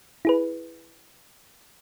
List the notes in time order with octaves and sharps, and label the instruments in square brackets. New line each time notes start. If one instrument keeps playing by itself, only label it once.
[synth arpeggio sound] E4 G#4 B4